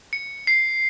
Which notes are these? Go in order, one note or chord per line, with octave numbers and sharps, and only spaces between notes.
C#7
C7